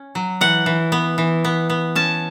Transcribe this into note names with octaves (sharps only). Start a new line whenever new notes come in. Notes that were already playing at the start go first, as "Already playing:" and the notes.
Already playing: C#4
F#3
E3 F#5
E3
B3
E3
B3
B3
C#4 A5